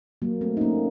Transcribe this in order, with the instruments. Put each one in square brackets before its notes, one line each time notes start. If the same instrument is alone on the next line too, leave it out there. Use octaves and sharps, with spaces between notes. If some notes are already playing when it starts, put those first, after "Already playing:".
[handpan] F#3 A#3
A3 C4
D#4
A#3 C#4